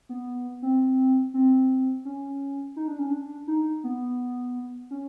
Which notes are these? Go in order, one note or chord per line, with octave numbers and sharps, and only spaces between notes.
B3
C4
C4
C#4
D#4
D4
C#4
D4
D#4
B3
C#4